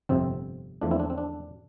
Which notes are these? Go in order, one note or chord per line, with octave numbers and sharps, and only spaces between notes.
G1 F2 C3 C4
E2 D3 F3 A3 D4
C4 E4
D4
C4
D4